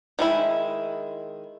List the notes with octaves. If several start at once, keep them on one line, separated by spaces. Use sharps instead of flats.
D#3 G#3 E4